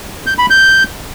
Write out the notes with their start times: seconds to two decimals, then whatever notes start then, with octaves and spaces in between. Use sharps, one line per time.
0.26 G6
0.38 B5
0.50 G6